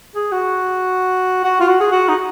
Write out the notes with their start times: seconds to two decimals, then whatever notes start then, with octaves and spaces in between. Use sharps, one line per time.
0.15 G#4
0.32 F#4
1.44 F#4
1.60 F4
1.68 F#4
1.80 G#4
1.92 F#4
2.08 D#4